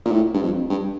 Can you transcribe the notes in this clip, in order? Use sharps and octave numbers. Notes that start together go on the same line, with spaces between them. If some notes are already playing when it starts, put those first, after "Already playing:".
A#2
A2
G2
F2
G2